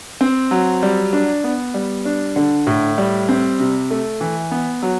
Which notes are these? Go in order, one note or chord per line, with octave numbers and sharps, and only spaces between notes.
C4
F#3
G3
D4
B3
G3
D4
D3
A2
G3
C4
C3
A3
E3
B3
F#3